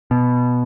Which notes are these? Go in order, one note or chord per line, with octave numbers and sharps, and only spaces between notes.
B2